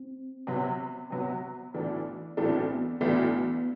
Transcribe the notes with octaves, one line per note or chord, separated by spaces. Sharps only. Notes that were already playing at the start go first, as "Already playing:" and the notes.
Already playing: C4
C3 F#3 B3
C3 F#3 B3
B1 A2 E3 A3 D4
B1 A2 E3 A3 C4 D4
B3
B1 A2 E3 A3 B3 D4